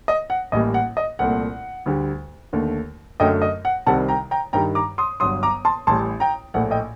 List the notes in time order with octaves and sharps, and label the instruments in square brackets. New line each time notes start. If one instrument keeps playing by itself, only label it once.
[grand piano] D#5
F#5
A1 A2 G3 A#3 D#5
F#5
D#5
C2 A#2 A3 F#5
D2 D3 G3
D#2 D3 A3
F#2 D3 F#3 A3 D#5 G5
D#5
F#5
C2 C3 D#3 G3 F#5 A5
G5 A#5
G5 A#5
G2 D#3 G3 G5 A#5
A#5 D6
C6 D#6
G1 G2 F#3 C6 D#6
A#5 D6
A5 C6
A1 A2 G3 A5 C6
G5 A#5
A#1 A2 A3 F#5
D#5 G5